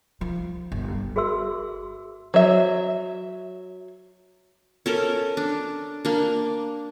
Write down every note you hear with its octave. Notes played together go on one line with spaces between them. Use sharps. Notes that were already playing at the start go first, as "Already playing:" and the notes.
F3
G1
F#4 G#4 A#4 E5 C6 E6
F#3 E5
C#4 A4 A#4
D4
A#3 D4